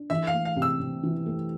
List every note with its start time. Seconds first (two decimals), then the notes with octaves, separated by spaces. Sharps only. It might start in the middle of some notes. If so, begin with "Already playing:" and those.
Already playing: D4
0.10 E3 E5
0.27 F5
0.34 A3
0.45 F5
0.56 C3
0.62 E6
0.80 C3
1.03 E3
1.26 A3